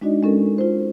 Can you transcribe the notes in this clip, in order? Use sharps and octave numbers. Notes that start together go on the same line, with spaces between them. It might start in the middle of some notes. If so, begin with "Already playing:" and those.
G#3 D4 D#4 F#4 D5 D#5
G#3 C#4 A4 A#4
F4 C5